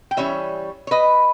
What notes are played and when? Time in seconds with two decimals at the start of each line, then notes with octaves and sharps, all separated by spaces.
0.11 G5
0.17 E3 G3 C#4 C#5 E5
0.87 C#5
0.91 B4 D#5